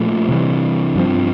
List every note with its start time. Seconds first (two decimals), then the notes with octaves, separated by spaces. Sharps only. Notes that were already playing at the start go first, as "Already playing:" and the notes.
Already playing: A#2 F3 A3
0.29 C3 E3 G3
0.96 G2 F3 C4